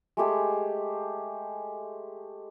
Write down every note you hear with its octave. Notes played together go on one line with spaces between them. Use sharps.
G#3 A3 G4 G#4